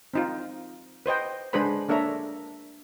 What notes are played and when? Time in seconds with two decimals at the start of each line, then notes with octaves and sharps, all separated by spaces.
0.14 C4 D#4 F4
1.06 B4 C5 D#5 G5
1.53 G#3 D4 G#4 B4 C5 B5
1.89 A#3 D4 A4 C#5 E5 A#5